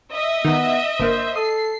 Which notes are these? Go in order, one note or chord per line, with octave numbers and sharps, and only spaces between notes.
D#5 E5
D#3 B3
G1 A#3 C5
A4 D#6 C7